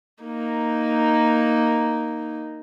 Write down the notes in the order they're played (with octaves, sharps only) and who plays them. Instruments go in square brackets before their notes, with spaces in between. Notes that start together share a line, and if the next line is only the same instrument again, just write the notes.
[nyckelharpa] A#3 D#4